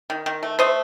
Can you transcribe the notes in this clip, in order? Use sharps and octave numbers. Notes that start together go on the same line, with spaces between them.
D#3
D#3
A3
A3 C5 D#5